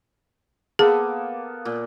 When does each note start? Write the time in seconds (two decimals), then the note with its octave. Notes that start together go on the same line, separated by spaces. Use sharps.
0.79 A#3 B3 G#4 A4
1.65 A#2